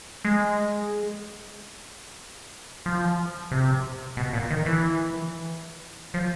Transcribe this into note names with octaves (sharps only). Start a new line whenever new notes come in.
G#3
F3
C3
B2
A#2
D#3
E3
F3